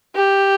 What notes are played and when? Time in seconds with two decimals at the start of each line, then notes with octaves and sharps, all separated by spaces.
0.15 G4